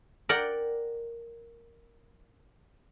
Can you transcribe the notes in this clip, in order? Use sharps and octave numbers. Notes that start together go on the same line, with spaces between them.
A#4 D5 F#5 G5